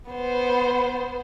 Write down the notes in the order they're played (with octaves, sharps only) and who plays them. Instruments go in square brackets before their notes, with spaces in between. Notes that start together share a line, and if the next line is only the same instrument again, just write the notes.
[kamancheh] B3 C5